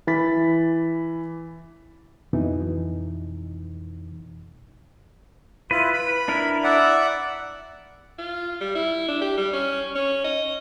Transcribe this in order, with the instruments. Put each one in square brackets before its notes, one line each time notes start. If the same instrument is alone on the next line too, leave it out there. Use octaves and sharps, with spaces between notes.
[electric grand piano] E3 B5 A6 B6
[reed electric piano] F2 B2 E3 D#4
[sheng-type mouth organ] E4 F4 [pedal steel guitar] B4
[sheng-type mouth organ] B5
[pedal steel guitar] D4 E4 A#4
[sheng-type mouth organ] D5 E5 F#5
[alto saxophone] F4
G3
E4
D4
G4
G3
C#4
C#4
D#5